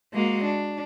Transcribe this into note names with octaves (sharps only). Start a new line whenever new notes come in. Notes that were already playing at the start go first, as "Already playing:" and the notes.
G#3 A#3 F#4
D4